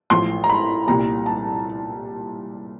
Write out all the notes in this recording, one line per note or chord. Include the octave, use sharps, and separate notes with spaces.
A1 A2 F3 C6
A#5
B5
C2 A#2 G3 A#5
A5